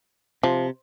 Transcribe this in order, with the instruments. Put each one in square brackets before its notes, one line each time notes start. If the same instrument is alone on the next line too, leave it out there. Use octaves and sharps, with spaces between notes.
[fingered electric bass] C3 [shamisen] F3